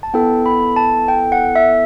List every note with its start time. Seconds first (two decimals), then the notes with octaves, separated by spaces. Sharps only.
0.03 A5
0.14 B3 E4 A4 G5
0.46 B5
0.76 A5
1.08 G5
1.32 F#5
1.56 E5